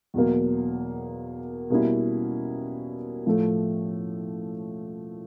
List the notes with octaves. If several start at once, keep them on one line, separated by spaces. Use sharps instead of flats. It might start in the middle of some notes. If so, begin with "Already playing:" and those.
E2 B2 F#3 A#3
B2 G3 A#3 C#4 E4
A2 F3 A3